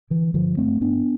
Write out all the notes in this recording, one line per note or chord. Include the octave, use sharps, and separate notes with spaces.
D3 E3
G2 D3 F3
G2 A3 C4
G2 B3 D4